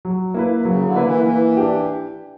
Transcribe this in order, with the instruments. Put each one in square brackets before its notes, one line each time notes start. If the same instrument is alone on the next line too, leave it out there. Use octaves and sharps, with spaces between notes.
[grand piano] F#3
A#3 E4 B4
[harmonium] C#3 [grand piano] F#3
[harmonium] D3
[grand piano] A#3 E4 B4
[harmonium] E3
[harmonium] E3 [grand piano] A#3
[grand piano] D4 G4